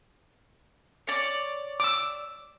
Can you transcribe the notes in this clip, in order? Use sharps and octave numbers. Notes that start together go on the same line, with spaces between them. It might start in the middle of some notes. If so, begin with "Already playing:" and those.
C#5 D5
D6 E6